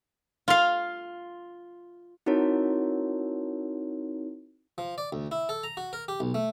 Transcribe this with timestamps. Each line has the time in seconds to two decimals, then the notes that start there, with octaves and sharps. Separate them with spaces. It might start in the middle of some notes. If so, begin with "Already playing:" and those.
0.48 F4 F5
2.26 C4 D#4 E4 F#4 A#4 C#5
4.78 F3
4.98 D5
5.13 D2
5.31 E4
5.49 A4
5.63 A#5
5.77 F#4
5.93 A#4
6.08 G4
6.20 B1
6.34 A3